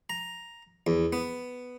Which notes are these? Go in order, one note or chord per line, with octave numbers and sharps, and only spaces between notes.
A#5
E2
B3